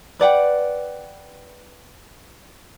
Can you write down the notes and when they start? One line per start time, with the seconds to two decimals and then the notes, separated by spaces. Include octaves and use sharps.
0.20 B4 D5 F#5 G5